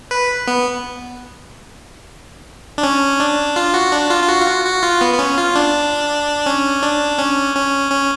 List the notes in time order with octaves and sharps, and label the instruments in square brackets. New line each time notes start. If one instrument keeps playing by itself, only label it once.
[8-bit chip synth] B4
B3
D4
C#4
D4
F4
F#4
D4
F4
F4
F#4
F4
F#4
F#4
F4
B3
B3
C#4
F4
D4
C#4
D4
C#4
C#4
C#4